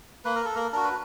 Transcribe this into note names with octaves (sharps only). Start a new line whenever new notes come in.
A#3 B4
A#4
A4
A#3 A#4
D4 F#4 A#4
B4